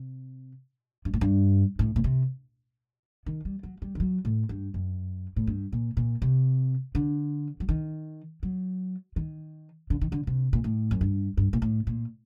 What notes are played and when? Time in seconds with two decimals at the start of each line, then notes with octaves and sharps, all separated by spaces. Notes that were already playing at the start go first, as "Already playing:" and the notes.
Already playing: C3
1.05 G2
1.14 A2
1.21 G2
1.79 A2
1.96 A#2
2.04 C3
3.26 D#3
3.45 G3
3.63 F#3
3.82 G3
3.95 D#3
4.00 F#3
4.25 A2
4.49 G2
4.74 F#2
5.36 A2
5.47 G2
5.72 A#2
5.97 A#2
6.22 C3
6.95 D3
7.60 F#3
7.69 D#3
8.43 F#3
9.16 D#3
9.90 D3
10.01 D#3
10.12 D3
10.27 C3
10.53 A#2
10.64 A2
10.91 F#2
11.01 G2
11.37 G2
11.53 A#2
11.62 A2
11.87 A#2